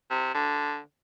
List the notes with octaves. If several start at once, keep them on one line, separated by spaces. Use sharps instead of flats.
C3
D3